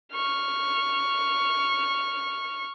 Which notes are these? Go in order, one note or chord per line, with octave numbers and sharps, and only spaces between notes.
C#6 F6